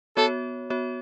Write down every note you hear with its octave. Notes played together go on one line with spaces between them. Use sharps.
B3 F#4 A4 C#5
B3 F#4 C#5